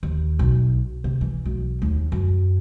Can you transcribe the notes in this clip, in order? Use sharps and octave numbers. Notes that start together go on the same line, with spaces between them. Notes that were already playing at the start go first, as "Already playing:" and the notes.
D#2
B1
C3
E3
B1
D#2
F#2